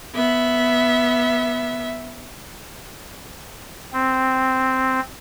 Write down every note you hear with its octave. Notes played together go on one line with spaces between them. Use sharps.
B3 E5
C4